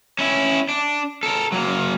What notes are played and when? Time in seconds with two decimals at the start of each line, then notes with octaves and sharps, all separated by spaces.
0.19 C#4 E4
0.69 D4
1.23 A4 A#4
1.52 F#3 A#3